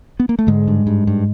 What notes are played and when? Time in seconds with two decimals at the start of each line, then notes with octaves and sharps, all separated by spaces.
0.20 B3
0.29 A#3
0.39 A3
0.47 G#2 D3 G#3
0.67 G2
0.87 G2
1.07 G2